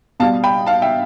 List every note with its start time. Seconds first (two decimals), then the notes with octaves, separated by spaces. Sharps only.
0.20 B2 G3 F5 A5
0.44 G5 B5
0.67 F5 A5
0.82 E5 G5